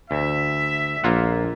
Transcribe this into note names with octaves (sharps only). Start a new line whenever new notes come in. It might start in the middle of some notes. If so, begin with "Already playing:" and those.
D2 E5
A#1 A#3 F4 F#5